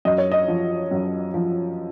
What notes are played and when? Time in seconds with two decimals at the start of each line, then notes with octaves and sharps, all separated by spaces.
0.05 F#2 D#5
0.18 C#5
0.31 D#5
0.48 F3
0.91 F#2
1.34 F3